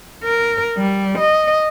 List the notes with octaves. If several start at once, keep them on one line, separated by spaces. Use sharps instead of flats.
A#4
G3
D#5